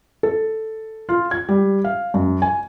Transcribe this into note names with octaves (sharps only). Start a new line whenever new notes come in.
A4
F4
G#6
G3
F5
F#2
G#5